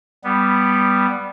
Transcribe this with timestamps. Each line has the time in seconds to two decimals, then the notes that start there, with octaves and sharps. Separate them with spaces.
0.24 G3 B3